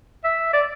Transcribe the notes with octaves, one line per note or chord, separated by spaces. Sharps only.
E5
D5